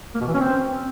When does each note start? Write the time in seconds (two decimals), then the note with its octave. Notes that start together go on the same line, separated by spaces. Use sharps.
0.15 A#3
0.21 B2
0.27 E3
0.34 C#4
0.40 C4